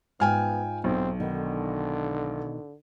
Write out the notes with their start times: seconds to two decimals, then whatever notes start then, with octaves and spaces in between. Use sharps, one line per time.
0.20 G#2 B3 F4 G5 G#5 F6
0.84 B1 C4
1.20 B2 D3 D#3